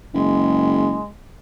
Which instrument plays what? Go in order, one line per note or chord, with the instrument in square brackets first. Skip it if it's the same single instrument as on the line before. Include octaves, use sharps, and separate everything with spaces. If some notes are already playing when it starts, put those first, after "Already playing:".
[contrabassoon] F#1 [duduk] G#3